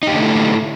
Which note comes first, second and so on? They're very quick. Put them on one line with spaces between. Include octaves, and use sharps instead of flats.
D#4 G4 D3 A3 E4